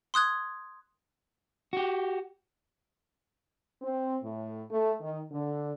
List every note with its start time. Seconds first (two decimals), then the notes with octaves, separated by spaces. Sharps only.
0.14 C6 D#6 F#6 G#6
1.73 F#4 G4
3.82 C4
4.23 A2
4.71 A3
5.01 D#3
5.31 D3